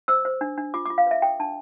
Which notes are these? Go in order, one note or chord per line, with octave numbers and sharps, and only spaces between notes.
C5 E6
C5
D4
D4
F4 D6
F4 D6
F5
B4 E5
A4 G5
D4 A5